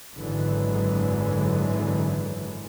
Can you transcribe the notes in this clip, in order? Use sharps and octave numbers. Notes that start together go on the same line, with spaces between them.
G#1 F#2 D3 E3 F#3 G#3